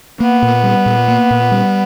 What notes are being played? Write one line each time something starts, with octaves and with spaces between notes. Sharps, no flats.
A#3 B3
A#2
G3
A#2
A#3
A#2
G3